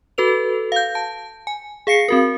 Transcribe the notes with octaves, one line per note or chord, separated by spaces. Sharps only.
F#4 A4 B4 F7
F5 G6
A5
G#5
G#4 F5 C7 C#7
C4 F#4 A#4